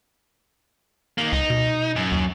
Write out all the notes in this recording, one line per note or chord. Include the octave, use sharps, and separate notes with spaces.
D#3 A#3
C#2 D#4
B2
F#2
D#2